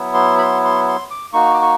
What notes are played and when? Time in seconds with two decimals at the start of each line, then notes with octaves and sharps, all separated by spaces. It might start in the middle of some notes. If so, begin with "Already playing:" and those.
Already playing: F#3 B3 E4
0.14 C6
0.39 B5
0.43 C6
0.65 C6
0.88 C6
1.11 D6
1.33 A#3 D#4 F#4 C#6
1.54 D6
1.62 C#6